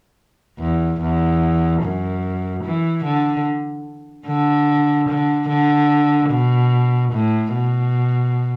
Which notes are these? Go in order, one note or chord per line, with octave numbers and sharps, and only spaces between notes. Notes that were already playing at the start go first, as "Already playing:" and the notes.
E2
E2
F#2
E3
D3
D3
D3
D3
B2
A2
B2